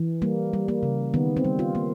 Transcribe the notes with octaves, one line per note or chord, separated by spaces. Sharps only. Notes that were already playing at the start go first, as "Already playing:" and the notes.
Already playing: E3
G3 A#3
G3
A#3
C#3
D#3 B3
C4
G3
F4
A#3